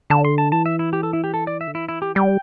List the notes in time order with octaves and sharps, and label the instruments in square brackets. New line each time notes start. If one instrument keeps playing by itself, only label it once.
[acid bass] D3 [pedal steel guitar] A5
[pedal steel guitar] C6
A5
[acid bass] E3 [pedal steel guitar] A5
[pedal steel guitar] E5
E4
G4
A4
E4
G4
A4
D5
E5
[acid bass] D3
[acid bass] E3 [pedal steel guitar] E4
[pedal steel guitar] E4
G4
[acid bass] G3 [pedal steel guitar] G5